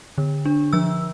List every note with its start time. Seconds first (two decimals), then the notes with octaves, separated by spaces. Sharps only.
0.18 D3
0.45 D4
0.73 F3 E6